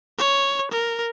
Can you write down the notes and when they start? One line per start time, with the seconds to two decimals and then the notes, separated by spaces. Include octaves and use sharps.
0.18 C#5
0.71 A#4